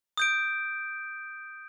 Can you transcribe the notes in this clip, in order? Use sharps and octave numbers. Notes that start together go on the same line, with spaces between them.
D#6 G6 D7